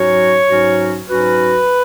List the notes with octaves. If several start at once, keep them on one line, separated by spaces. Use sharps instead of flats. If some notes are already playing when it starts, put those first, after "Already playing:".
Already playing: G#2 F#3 C#4 F#4 C#5
G#2 F#3 C#4 F#4
G#2 F#3 C#4 F#4 B4